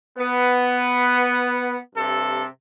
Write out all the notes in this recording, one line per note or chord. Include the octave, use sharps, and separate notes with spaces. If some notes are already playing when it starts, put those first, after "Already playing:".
B3
G2 C3 A4